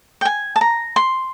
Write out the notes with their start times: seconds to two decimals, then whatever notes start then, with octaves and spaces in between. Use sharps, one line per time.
0.21 G5
0.25 G#5
0.56 A5
0.61 A#5
0.96 C6